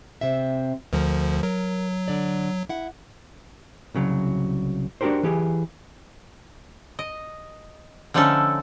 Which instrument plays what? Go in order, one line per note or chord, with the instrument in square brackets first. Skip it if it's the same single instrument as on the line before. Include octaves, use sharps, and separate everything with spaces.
[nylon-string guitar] C3 C4 E5
[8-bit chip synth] D2 D3 F3 [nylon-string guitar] A#4
[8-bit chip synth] F#3 [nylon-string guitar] A#4
[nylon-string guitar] D3 D5
E4 F#5
[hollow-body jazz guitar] C2 C#3 F#3
D4 F#4 G4 A#4 C5
E3 G4 G#4
[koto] D#5
D3 F3 A3 C#4 D#4 A4